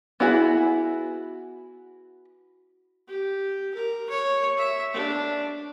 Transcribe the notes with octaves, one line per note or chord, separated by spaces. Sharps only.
B3 E4 F#4 G#4
G4
A#4
C#5
E5
D4